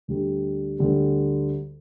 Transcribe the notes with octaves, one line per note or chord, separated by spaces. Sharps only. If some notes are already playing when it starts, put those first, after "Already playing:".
D2 D3 G3
D2 D3 G3